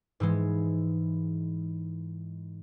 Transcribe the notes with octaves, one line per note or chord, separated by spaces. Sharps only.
G#2 E3 G#3